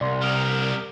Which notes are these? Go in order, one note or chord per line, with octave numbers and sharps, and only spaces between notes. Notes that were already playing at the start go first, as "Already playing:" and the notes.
C2 D5 C6
G3 A#4 D#6 F6